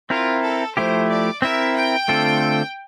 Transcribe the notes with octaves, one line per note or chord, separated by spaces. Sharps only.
C4 E4 F4 A#4
A4
F3 A3 E4 G4 C5
D5
C4 E4 A#4 E5
G5
D3 A3 C4 F4 A4